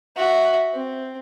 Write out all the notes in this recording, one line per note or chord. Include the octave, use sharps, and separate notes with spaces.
F#4 E5
C4